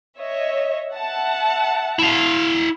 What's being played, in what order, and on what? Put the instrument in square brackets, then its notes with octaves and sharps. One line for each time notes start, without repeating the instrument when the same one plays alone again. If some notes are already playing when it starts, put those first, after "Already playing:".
[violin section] C#5 D#5 E5
E5 F#5 A5
[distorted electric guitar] E4 F5